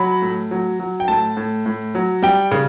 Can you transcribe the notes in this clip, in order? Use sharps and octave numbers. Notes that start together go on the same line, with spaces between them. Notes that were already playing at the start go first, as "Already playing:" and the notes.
Already playing: F#3 B5
A2
F#3
F#3
G5
A2 A5
A2
A2
F#3
G3 G5
C#3